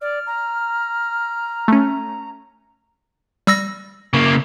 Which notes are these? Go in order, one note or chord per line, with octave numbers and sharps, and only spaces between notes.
D5 F6
A#5
A3 C#4
G3 E6 A#6
C#3 A#3